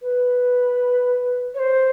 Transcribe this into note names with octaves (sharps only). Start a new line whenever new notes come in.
B4
C#5
C5